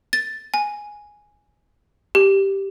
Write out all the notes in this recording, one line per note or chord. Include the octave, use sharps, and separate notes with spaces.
A6
G#5
G4